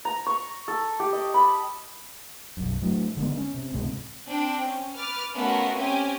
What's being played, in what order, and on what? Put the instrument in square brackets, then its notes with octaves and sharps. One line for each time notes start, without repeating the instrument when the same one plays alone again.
[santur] A#5
C#6
A4
G4
D#5
B5
[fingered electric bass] B1 F#2
A2 F#3
D3 G#3 B3
C#4
C3
C#2 A2 C3 G#3
[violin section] C4 D4 G5
C#4
B4 D6 F6 A6
A3 B3 C#4 F4 F#4 A#4
C4 C#4 G4 G5 G#5